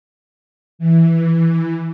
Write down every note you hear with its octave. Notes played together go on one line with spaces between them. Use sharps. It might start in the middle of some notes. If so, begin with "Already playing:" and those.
E3